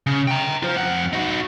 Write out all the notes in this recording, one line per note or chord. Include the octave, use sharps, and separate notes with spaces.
C#3
G5 A#5
F4 C5
F2 F#5
D#4 F#4